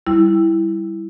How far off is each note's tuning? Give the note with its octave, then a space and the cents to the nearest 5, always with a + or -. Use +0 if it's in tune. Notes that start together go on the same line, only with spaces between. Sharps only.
G3 -5 E4 +0